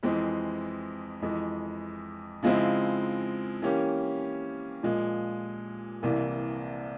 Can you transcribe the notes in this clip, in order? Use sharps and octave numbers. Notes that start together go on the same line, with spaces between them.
F2 E3 G#3 C4
F2 E3 G#3
C#3 F3 G#3 C4 E4
E3 A#3 C#4 G4
A#2 F3 G#3
C2 C3 E3 A#3